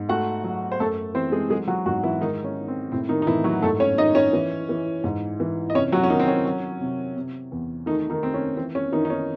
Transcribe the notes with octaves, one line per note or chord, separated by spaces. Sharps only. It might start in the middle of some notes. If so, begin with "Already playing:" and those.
Already playing: G#2
A3 F#4 F#5
F#3
C5
F#2 A3 A4
E3 C4 C5
G#3 G#4
F#3 G#3 G#4
F#3 F#4
G#2 F#3 F#4
E3 E4
D#3 G#3 D#4
C#4
D#3
C4
A2 C4
D#3 D#4
D#4
A2 E3 E4
F#3 F#4
G#2 A3 A4
C#4 C#5
D#3 D#4 D#5
C#4 C#5
E3
E3
G#2
E3
D#5
C3 C#4 C#5
F#3 F#4
C#4
D#3 F#3 D#4
C4
C#4
F#3
C3
C3
E2
D#3 A3 D#4
D#3 D#4
A3 C4
C#4
E3 C4
C#4
D#3 E3 D#4
D#4
C#4